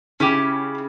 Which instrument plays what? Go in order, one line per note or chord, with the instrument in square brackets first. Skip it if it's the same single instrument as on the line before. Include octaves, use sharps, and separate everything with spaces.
[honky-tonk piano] C#3 [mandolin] C#4 E4 G4